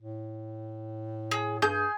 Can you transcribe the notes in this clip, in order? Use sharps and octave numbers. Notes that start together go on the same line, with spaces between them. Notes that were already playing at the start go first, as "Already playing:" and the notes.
A2
G#4
G2 G#4 G6